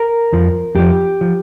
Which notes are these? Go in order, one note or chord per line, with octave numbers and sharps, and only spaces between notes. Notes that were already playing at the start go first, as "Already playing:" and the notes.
Already playing: A#4
F2 F3
F2 F3 G4
F3